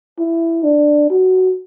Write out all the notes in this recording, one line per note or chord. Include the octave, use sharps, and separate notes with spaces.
E4
D4
F#4